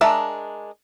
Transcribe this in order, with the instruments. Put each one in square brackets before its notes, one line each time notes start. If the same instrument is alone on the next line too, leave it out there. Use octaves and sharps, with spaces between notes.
[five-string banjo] G#3 D4 A#4 E5 A5